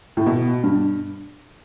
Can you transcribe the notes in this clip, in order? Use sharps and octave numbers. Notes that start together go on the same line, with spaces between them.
A2
B2
G2